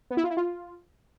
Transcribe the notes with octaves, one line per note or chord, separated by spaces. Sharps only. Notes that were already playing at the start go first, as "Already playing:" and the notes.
B3
E4
F4
E4
F4